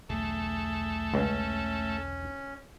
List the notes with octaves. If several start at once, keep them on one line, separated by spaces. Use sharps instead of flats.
B1 E2 D3 A3 G#4
C#2 C#4